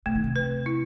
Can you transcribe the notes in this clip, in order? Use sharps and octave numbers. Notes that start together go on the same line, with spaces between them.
C3 A3
D#3
C3
B4
E4